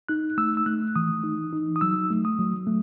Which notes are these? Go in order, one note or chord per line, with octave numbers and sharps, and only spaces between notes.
D#4 F#6
A3 E6
E6
A3 F#6
E3 D#6
D#4
D#4
D#6
F#3 E6
A3
D#6
F#3
A3